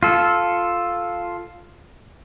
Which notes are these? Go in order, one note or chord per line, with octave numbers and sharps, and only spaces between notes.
F4 A4